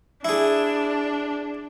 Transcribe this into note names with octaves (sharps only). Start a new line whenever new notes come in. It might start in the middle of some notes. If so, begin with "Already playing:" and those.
D4 E4 G#4